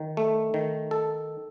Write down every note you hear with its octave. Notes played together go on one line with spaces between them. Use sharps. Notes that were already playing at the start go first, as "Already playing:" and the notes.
Already playing: D#3
A3
D#3
A4